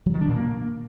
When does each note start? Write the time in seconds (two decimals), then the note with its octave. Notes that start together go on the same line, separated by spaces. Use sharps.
0.06 F#3
0.14 D#3
0.21 D4
0.28 A#2
0.36 A#3